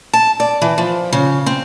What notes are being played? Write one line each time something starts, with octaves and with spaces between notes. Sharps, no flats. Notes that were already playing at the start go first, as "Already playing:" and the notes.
A5
D5
E3
F3
C#3
C4